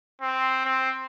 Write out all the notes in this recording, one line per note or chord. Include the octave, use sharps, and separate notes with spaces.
C4
C4